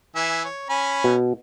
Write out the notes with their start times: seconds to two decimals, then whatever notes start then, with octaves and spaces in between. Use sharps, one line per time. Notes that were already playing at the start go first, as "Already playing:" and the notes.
0.16 E3 E5 G#5
0.45 C#5
0.69 C#4 G#5 B5
1.04 B2